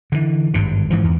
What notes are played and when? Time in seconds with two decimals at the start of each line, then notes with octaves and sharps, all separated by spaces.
0.12 D3 E3
0.54 G#1 G2 D3
0.90 G#2 E3 F3
1.04 E2